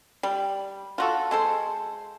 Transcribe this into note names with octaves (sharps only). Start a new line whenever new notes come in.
G3
F4 F#4 A4
G#3 A4 C5